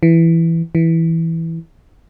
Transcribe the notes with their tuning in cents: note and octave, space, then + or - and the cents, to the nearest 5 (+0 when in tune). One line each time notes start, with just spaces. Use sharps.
E3 +5
E3 -5